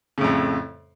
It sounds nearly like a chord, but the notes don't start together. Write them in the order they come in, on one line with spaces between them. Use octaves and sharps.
C#3 A2 F2